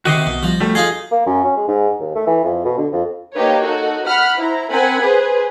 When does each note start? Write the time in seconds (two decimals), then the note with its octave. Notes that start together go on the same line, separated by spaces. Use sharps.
0.05 C3 D#3 F#4 D#5 B6 C7
0.26 B1 B2
0.43 F3 G3 A#6
0.60 G3 A3 F#4 A4
0.75 D#4 F4 G#4 D#5
1.11 A#3
1.26 F#2
1.44 C#4
1.57 G#3
1.68 G#2
2.00 D#2
2.15 A3
2.27 E3
2.44 F2
2.65 B2
2.77 D3
2.92 F2
3.35 A#3 D#4 G4 B4 C#5
3.63 D#4 F#4 A4
4.06 F#5 B5 F6
4.37 E4 C5 A#5
4.70 C4 A#4 F#5 G#5 B5
5.01 G#4 B4 C5